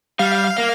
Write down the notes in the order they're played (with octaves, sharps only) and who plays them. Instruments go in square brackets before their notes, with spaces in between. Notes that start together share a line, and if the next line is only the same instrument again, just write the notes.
[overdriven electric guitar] G3 [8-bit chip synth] F5
[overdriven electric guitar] A#3